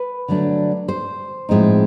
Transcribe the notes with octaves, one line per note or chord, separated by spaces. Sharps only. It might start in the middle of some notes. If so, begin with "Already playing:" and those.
Already playing: B4
D3 F#3 A3 D4
C5
A2 F3 G#3 C4 D#4